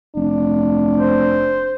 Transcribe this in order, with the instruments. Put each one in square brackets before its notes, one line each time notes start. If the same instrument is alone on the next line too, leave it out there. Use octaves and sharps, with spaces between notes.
[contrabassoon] F1 [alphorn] D4
[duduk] C5